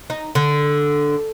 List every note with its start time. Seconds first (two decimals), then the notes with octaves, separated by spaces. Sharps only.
0.10 D#4
0.35 D3